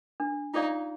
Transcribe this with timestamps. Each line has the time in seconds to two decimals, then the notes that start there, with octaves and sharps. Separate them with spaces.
0.20 D4
0.54 D#4 F4 G#4 D5 F5